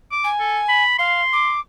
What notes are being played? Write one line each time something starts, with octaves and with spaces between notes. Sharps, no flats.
D6
G#5
A4
B5
F5 C6
D6